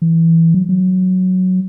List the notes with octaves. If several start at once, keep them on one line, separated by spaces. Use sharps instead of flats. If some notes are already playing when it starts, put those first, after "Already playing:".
E3
F#3
F#3